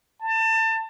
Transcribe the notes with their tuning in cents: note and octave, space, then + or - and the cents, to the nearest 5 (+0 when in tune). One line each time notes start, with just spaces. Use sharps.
A5 +30